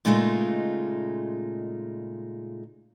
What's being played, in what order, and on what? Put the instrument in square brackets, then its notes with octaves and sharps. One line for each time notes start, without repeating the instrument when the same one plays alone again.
[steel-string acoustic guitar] A#2 C#3 G#3 A3 D#4 F4